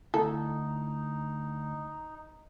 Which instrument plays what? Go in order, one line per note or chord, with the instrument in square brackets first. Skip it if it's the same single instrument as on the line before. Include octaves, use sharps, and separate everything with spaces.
[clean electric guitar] D2 [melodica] D#4 [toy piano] E4 [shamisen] A4